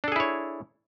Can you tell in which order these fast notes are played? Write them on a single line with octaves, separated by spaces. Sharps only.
D4 A4 G#4 E4 C#5